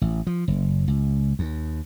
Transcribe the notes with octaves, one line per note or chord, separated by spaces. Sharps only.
A1
F3
F#1
C#2
D#2